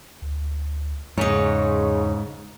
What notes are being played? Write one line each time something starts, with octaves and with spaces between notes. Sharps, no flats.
D2
E2 G#2 C#3 D#4 C#5